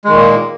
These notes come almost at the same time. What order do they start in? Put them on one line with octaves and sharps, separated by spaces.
G#3 D#3 A#2 A#3